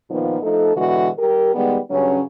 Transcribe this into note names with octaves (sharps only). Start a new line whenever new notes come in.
A#2 D#3 F3 B3 D#4
F3 A3 D#4 A4
B2 D3 E3 G#3 F#4
G3 G4 A#4
D#3 G3 G#3 B3
G2 C#3 F#3 C#4